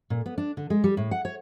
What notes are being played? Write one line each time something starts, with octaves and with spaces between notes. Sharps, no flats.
A#2
B3
D4
D3
G#3
G3
A2
F#5
C#5